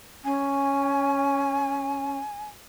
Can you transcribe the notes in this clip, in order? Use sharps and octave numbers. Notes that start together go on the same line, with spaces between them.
C#4 G#5